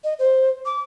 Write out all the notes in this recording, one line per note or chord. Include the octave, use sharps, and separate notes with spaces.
D#5
C5
D6